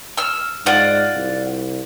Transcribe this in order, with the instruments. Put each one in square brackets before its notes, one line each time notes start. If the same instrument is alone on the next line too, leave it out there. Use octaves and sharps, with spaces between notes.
[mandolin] E6 F6
[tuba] G#2 [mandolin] F4 D5 F#5
[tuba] C2